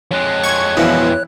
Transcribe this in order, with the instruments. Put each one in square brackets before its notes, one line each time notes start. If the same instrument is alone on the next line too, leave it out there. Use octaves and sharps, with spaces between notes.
[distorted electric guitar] F2 G#3 [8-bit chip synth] C#5 F#6
[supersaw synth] C#6 G#6
[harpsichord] B2 F3 C#4 [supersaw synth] E3 E4